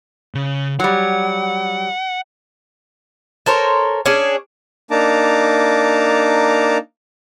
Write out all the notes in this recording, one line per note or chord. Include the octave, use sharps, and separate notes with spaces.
C#3
F#3 G3 F#5
A4 A#4 C5 C#5
C#4 D4 G#4
A#3 D4 D#4 A5 A#5 D6